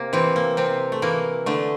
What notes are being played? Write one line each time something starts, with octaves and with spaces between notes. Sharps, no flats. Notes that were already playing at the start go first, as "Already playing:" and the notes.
Already playing: C3 A#3
E3 C4
A#3
C3 C4
A3
E3 A#3
D3 A3